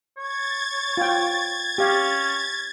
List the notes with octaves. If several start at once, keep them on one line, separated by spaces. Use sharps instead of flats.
C#5 G#6 A6
F4 G5
C#4 G4 F5